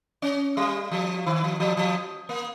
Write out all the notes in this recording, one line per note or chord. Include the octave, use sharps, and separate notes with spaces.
C#4
G3
F3
D#3
F3
F3
F3
A#3